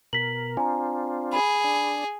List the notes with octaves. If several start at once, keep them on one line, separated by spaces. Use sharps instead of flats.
B2 A#4 B6 F#7
C4 D4 F4 G#5 A#5
G#4 B5
D4